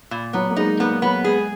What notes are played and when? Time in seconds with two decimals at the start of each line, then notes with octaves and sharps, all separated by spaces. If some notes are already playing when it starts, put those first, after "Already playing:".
0.11 A#2
0.33 F#3 B3
0.50 A#3
0.56 G#3 D#4
0.80 A#3 B3
1.02 F#3 B3
1.24 G#3 G#4